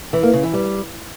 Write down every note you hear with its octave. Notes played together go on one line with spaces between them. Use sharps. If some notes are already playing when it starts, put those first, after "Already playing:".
E3
A#3
C#3
E3
G3